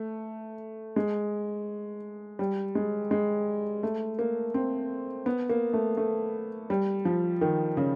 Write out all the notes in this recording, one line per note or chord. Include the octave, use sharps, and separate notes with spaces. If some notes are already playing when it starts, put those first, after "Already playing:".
Already playing: A3
G#3
G3
G#3
G#3
A3
A#3
C4
B3
A#3
A3
A3
G3
F3
D#3
C#3